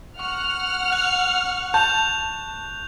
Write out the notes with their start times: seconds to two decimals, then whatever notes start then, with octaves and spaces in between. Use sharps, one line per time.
0.19 F#5 C#6 F6
0.92 F#6 F7
1.74 A5 G6 F7